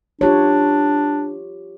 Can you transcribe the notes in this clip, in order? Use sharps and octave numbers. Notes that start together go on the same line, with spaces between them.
D4 F4 G4 C#5